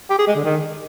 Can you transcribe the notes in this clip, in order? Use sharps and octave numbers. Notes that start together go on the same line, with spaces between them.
G4
G#4
G#3
D3
D#3